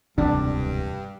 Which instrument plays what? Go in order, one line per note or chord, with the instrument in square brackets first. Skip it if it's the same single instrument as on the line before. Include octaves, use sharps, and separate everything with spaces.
[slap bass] E1 D2 E3 [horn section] G2 [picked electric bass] C3 [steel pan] D4